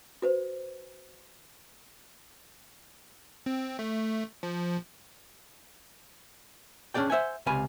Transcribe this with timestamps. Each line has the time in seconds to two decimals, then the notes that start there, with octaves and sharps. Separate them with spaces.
0.22 F#4 B4 C5
3.46 C4
3.79 A3
4.43 F3
6.94 C#4 D4 G#4 D5 G5
7.10 C5 E5 F#5 G#5
7.46 C#2 C3 F5 G#5 B5